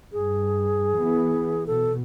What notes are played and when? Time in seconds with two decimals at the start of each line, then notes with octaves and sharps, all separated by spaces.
0.13 G2 G#4
0.97 E3 B3
1.67 B2 A4